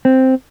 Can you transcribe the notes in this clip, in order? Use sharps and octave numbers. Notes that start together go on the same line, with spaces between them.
C4